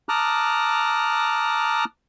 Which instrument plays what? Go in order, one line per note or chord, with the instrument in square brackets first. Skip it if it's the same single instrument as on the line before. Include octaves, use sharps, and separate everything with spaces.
[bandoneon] A5 A#5 D6 D#6 F6 F#6